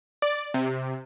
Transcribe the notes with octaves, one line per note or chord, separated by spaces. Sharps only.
D5
C3